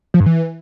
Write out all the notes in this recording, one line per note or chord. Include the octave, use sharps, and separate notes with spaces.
F3
G2
E3